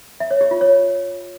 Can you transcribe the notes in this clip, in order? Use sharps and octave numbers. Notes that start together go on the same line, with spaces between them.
E5
C#5
G4
F4
C#5